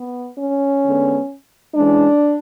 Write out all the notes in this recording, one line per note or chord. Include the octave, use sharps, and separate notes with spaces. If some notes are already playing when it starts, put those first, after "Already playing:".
Already playing: B3
C#4
D3 G#3 B3
E3 G#3 C#4 D4